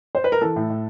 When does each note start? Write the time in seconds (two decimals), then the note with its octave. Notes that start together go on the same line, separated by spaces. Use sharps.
0.15 C5
0.24 B4
0.32 A#4
0.41 E3 A4
0.56 A2
0.70 A2